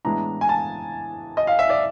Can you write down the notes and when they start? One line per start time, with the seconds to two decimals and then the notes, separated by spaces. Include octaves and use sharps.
0.04 A2 E3 G#3 B3 D4 A#5
0.41 G#5
0.49 A5
1.37 D#5
1.47 F5
1.59 E5
1.69 D5